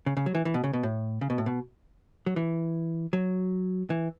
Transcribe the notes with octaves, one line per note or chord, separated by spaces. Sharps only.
C#3
C#3
F#3
E3
E3
B2
C#3
B2
A2
C#3
B2
A2
B2
F#3
E3
F#3
E3